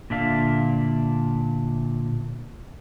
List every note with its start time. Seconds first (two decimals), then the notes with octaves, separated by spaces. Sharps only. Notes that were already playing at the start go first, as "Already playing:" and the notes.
0.10 A#2 D3 D4 E5 F5